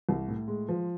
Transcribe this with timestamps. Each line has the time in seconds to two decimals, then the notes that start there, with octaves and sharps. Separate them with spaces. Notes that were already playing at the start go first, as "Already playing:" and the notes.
0.09 C2
0.28 A2
0.48 G#3
0.69 F3